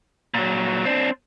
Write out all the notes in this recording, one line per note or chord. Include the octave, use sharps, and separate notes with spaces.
A#2 F#3
C4 D4